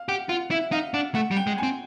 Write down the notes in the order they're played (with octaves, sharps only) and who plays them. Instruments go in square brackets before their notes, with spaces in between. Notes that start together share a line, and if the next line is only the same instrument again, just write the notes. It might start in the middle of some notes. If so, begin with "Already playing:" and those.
Already playing: [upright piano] F5
[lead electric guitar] G4 [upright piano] F#5
[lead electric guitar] F4 [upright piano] F#5
[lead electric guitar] E4 [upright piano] E5
[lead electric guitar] D#4 [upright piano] F5
[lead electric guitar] D4 [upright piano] F#5
[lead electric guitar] A3 [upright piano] F#5
[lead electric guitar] G3
[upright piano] G5
[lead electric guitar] G#3
[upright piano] G#5
[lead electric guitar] C4